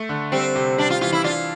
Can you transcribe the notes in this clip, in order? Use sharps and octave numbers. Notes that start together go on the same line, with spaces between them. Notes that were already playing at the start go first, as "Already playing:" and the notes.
Already playing: A3
D3
G3 C4
C3
G3 D4
F4
E3 F4
E4
D4 F4